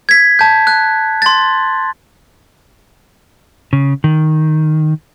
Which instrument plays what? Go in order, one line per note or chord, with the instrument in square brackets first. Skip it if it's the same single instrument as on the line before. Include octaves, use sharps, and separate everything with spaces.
[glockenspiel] G#6 B6
A5 G6
F#6
C6 A6
[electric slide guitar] C#3
D#3